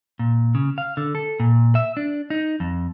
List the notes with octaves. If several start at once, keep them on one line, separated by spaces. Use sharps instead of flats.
A#2
C#3
F5
D3
A4
A#2
E5
D4
D#4
F2